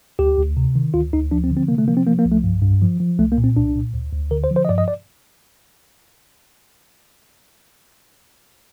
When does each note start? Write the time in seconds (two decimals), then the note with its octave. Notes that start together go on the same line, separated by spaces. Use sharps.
0.19 D2 G4
0.37 D2
0.57 C3
0.75 D#3
0.94 D2 F4
1.13 D2 D#4
1.31 F3 D4
1.44 C4
1.51 D3
1.57 C4
1.68 C3 A#3
1.78 A3
1.88 F3 A#3
1.97 C4
2.07 F3 A#3
2.19 A#3
2.25 C2
2.32 A3
2.44 G2
2.62 G2
2.82 F3
3.00 F3
3.19 C2 A3
3.32 A#3
3.38 A#2
3.44 C4
3.56 C2 D4
3.75 A#2
3.94 D2
4.12 D2
4.31 D3 A#4
4.44 C5
4.51 F3
4.56 C5
4.65 D#5
4.69 G2 D5
4.78 D#5
4.88 D5